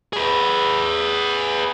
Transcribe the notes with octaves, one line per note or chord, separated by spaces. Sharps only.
G#4 B4